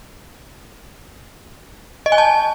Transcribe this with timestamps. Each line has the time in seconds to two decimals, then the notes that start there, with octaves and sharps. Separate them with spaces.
2.06 D#5
2.12 G#5
2.18 A5